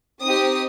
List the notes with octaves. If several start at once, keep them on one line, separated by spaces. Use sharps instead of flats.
C4 D#4 G4 D#6